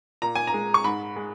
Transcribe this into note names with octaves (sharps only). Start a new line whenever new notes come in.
A#2 A#5
G#5
A#5
G#3
C#6
G#2 B5
G#3